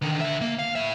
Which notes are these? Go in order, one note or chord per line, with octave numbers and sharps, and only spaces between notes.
D3 D#3
D3 E5
A#3
F5
A2 E5